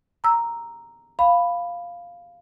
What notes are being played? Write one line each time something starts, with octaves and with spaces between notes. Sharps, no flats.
A#5 E6
F5 B5